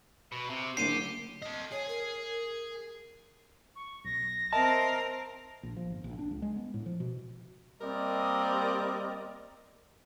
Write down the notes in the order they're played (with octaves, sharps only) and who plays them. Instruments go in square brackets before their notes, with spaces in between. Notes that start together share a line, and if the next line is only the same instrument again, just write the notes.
[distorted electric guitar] B2
C3
[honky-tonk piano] F#1 D2 [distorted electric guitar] G4 [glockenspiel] C7 D#7
[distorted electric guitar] A4 D#5
[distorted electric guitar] G#4 [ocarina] C#5
[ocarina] A#4
[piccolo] C#6
[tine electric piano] B1 [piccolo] A#6
[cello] C4 A#4 [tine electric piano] D#5 E5 [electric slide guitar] A5
[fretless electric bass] A#1
F3
G1
A#1
D4
C#2
G#3
B3
A2
F3
B2
[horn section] G3 A#3 C4 A#4 D5 D#5